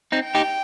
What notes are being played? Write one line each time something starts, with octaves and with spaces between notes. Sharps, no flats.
C4 D#4
G5
D#4 G4